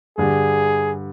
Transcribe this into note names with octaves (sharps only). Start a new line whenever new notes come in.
G2 D3 G3 G#4